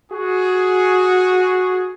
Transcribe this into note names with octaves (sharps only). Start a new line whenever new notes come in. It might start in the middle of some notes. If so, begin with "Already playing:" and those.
F#4 G#4